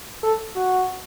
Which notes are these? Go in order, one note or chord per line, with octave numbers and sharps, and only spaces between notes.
A4
F#4